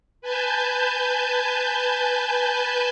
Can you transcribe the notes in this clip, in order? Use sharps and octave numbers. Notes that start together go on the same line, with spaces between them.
B4 G#5 A5 G6